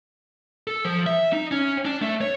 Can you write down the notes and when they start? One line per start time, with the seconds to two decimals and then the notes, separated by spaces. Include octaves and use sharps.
0.67 A4
0.84 F3
1.07 E5
1.33 D#4
1.51 C#4
1.85 D4
2.02 A3
2.21 C#5